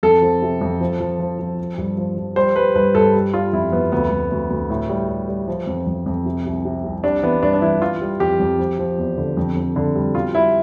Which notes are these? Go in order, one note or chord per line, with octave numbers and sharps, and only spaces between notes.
F2 A4
F3
C3
F2
F3
F3
F3
F3
F3
G2
F3
F3
G3 C5
G3 B4
G2 B4
G2 A4
G3
G3 F4
F2 E4
F2 B3
D2 B3
D2
D2
D2
A2
G3
G3
G3
F3
F2
F2
F2
C3
C2
C3
C2
G3 D4
E3 B3
G2 D4
D4
E3 E4
E3 F4
G3
F2 G4
F2
F3
F3
E2
D3
F2
F2
D3
G3
B2 F4
G3 E4